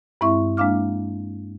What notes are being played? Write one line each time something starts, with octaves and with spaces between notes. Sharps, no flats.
G2 G#3 C4 E4 E5 C#6
G#3 A#3 D4 F5 D6 F6